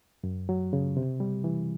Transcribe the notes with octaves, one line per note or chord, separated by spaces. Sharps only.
F#2
F#3
C#3
C3
G3
E3